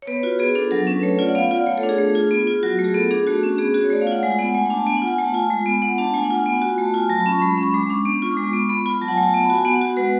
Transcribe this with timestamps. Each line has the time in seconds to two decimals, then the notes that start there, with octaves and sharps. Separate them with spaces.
0.02 C#5
0.07 B3 B4
0.23 F4 F#4
0.39 B3 G#4
0.55 D4 A4
0.71 F#3 A4
0.87 C#4 B4
1.03 A3 C#5
1.19 F4 D5
1.28 F#5
1.35 B3 F5
1.51 F4 D5
1.67 A3 C#5
1.78 A4
1.83 D4
1.89 G#4
1.98 A3
2.15 F4
2.31 B3
2.47 F4
2.63 F#3 F#4
2.79 A3
2.84 G#4
2.94 B3 A4
3.11 D4 G#4
3.27 A3 F#4
3.43 C#4
3.58 B3 G#4
3.74 F#4 G#4
3.84 C#5
3.90 A3 D5
4.01 F5
4.07 F4 F#5
4.23 G#3 G#5
4.38 B3 F#5
4.54 A3 G#5
4.66 G#5
4.70 D4 A5
4.87 B3 G#5
4.97 F#5
5.02 F4
5.08 G#5
5.19 A3 A5
5.34 F4 G#5
5.50 G#3
5.66 B3
5.82 B3 F#5
5.98 D4 A5
6.14 A3 G#5
6.24 F#5
6.30 F4 G#5
6.46 B3
6.62 F#4
6.78 A3 A5
6.94 F4 G#5
7.10 F#3 A5
7.21 B5
7.26 C#4
7.32 C#6
7.42 G#3 B5
7.53 C#6
7.58 C#4
7.63 C#6
7.74 G#3 D6
7.83 C#6
7.90 D4 D6
8.05 B3 C#6
8.22 F4 C#6
8.32 G#3 D6
8.43 C#6
8.53 B3
8.69 B3 B5
8.86 F4 B5
9.01 F#3 A5
9.08 F#5
9.13 G#5
9.18 A3
9.23 A5
9.34 B3 A5
9.45 B5
9.50 F#4 G#5
9.65 B3 F#5
9.75 F#5
9.82 F#4
9.97 G#3 B4